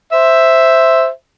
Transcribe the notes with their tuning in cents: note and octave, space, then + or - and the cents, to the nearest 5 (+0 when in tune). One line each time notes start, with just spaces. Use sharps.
C5 +0 E5 +0